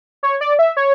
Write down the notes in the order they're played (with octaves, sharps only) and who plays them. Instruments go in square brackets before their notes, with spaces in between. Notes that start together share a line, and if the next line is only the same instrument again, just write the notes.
[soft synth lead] C#5
D5
E5
C#5